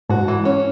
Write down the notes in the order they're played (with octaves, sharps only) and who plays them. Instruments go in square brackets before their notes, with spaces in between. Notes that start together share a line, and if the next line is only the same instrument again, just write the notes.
[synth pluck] G#2 G#3 [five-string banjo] F#4
[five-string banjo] E3
C#4